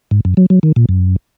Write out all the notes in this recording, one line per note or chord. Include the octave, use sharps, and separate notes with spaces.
G#2
F#2
F#3
F#3
D#3
A#2
F#2